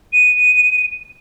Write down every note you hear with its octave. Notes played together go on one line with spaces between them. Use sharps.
D#7